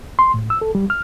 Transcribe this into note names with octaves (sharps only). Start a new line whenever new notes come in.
C6
A2
E6
A4
G3
F6